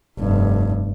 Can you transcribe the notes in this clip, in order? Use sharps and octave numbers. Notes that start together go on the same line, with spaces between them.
F1 G2